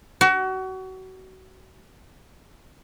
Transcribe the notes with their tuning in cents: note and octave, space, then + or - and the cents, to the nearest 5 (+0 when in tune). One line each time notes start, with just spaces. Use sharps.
F#4 +30